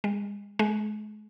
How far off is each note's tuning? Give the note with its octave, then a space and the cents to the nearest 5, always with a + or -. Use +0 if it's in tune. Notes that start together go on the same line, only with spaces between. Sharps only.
G#3 -40
G#3 +35